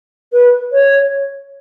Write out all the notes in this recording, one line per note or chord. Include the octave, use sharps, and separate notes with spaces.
B4
C#5